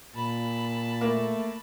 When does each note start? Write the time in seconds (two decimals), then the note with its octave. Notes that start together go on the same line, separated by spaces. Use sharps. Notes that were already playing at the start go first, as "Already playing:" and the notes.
0.15 A#2 A5 B5
1.01 A3 A#3